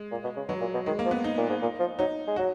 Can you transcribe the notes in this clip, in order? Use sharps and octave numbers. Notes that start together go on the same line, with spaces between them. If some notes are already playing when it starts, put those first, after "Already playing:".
Already playing: G#3
A#2
B2
C#3
B2 F#3
A#2
B2
D#3 G#3
A#3
F3
B3
D#4
A#2
G#2
A#2
F3
F#3 D#4
G#3
F#3 F#4